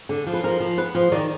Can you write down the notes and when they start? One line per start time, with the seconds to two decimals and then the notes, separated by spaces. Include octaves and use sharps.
0.09 D3
0.27 F3
0.34 B4
0.43 F3 A#4
0.60 F3
0.78 B3 B4
0.95 F3
1.12 D#3 D5